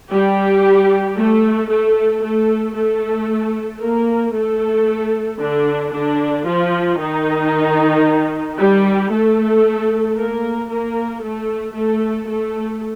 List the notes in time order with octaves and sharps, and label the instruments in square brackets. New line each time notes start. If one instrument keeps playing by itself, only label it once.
[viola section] G3 G4
A3 A4
A3 A4
A3 A4
A3 A4
A#3 A#4
A3 A4
D3 D4
D3 D4
F3 F4
D#3 D#4
G3 G4
A3 A4
A#3 A#4
A#3 A#4
A3 A4
A3 A4
A3 A4